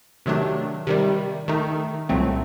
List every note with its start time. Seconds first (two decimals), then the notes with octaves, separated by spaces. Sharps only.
0.26 C3 D#3 F#3 A3 D4
0.87 C3 D#3 G3
1.48 D#3 A3 D#4
2.09 C2 A#2 F#3 A3 C4